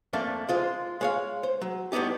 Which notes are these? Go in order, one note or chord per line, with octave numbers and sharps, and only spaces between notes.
F2 A3 A#3 D4
G#3 F4 C5
G#3 C#5 F5
C5
F#3
A2 G3 B3 D#4 G4